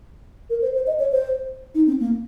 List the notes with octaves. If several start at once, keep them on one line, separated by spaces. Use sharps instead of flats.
A#4
C5
C5
D#5
C#5
C5
D#4
C4
A#3